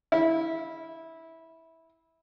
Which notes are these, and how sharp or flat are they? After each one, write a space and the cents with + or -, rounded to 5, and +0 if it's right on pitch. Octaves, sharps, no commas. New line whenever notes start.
E4 -15